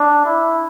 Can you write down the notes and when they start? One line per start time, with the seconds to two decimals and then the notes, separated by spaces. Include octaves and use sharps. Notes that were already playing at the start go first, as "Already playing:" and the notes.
Already playing: D4
0.25 E4